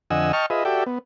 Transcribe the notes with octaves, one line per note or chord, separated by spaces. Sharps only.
F2 D3 D#5 F#5 G#5 E6
D#5 G5 A5 C#6 F6
F4 G#4 B4 D#5 E5
F#4 G4 A4 D5 E5 G5
B3